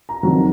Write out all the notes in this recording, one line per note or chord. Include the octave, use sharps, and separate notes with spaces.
A#5
F2 D#3 F#3